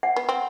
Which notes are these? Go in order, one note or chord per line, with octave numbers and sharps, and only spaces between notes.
F#5
B3
C4